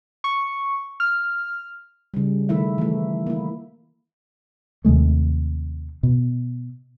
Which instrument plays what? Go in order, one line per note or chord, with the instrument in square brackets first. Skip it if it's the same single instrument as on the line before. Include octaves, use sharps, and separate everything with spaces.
[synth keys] C#6
F6
[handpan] C#3 G3
D#3 A3 E4 E5
E3 A3
A#3 E4
[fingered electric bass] D#2 C3 G#3 A3
B2